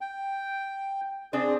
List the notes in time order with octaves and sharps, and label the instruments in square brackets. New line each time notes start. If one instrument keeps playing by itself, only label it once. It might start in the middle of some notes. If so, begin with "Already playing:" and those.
[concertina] G5
[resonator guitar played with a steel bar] C4 D4 C5 [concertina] G#4